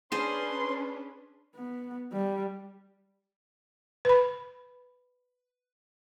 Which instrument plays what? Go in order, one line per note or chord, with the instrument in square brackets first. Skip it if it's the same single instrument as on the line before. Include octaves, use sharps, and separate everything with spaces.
[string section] C#4 D4 B4 [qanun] G#4 C5 [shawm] C6
[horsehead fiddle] B3
G3
[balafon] B4 B5